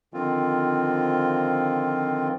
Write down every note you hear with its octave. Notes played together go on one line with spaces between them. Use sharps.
D3 D#3 F3 C4 F4